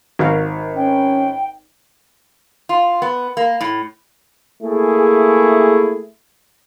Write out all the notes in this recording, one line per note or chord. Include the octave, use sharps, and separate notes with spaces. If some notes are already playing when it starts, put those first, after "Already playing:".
G#1 F#4 A#4 F5
C#4 G5
F4
B3
A#3
A2
A3 A#3 E4 G#4